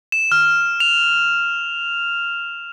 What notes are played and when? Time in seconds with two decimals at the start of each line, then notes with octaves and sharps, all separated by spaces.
0.12 E7
0.32 F6
0.80 F7